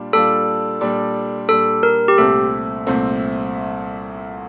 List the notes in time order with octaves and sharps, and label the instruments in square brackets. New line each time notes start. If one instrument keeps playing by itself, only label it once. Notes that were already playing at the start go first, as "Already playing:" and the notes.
Already playing: [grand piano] A#2 G3 D4 F4
[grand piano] A#2 G3 D4 F4 [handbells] A4
[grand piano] A#2 G3 D4
[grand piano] A#2 G3 D4 [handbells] A4
[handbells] A#4
G4
[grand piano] C2 A#2 A3 C4 [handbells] A4
[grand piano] C2 A#2 A3 C4